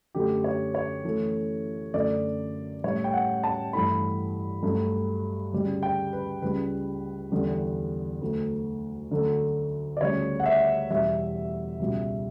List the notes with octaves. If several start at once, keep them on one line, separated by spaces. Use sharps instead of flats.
F#2 D3 A3 G4
C#5
C#5
F#2 E3 A3
F#2 D3 A3 D5
A2 G3 C#5
G5
F#5
A5
G2 E3 A3 B5
G2 F#3 A3
D2 C#3 G3
G5
B4
C#2 C#3 G3 B4
E2 D3 G3
D2 D3 F#3 A3
D2 D3 F#3 A3
D5
D2 C#3 G3 C#5
F#5
E5
E2 B2 G3 E5
C#2 B2 G3